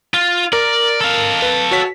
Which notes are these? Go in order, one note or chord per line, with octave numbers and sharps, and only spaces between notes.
F4
A#4 D5
A4 F5
B4
F#4 C#5 B6